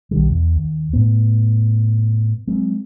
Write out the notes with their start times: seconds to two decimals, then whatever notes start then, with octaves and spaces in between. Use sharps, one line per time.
0.11 B1 D#3 G3
0.29 E2
0.56 D#2
0.93 A2 B3
2.47 F#3 G#3 C4